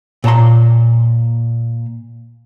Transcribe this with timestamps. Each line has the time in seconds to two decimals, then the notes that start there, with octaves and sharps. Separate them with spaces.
0.24 A#2 C#5 A5 A#5 C6